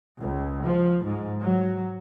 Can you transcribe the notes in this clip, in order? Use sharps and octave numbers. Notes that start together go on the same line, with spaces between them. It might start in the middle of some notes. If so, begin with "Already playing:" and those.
C#2
F3
G#2
F#3